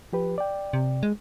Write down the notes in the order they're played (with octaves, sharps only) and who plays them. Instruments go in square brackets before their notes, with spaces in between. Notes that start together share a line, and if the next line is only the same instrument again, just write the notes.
[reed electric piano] F3 G4 B4
D5 G5
[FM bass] C3
G#3